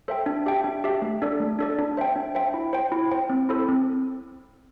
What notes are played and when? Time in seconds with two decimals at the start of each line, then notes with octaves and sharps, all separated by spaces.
0.08 A4 C5 E5 G5
0.26 D4
0.46 G4 E5 G5
0.64 D4
0.84 G4 E5 G5
1.02 A3
1.22 D4 A4 D5
1.40 A3
1.59 D4 A4 D5
1.79 D4
1.97 C5 E5 G5
2.16 D4
2.35 C5 E5 G5
2.54 E4
2.73 C5 G5
2.92 E4
3.11 C5 G5
3.30 C4
3.49 E4 A4 C5
3.69 C4